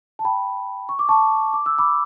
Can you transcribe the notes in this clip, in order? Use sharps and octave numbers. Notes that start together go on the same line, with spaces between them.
A5
G5 B5
C#6
D6
A5 C#6
D6
E6
B5 D6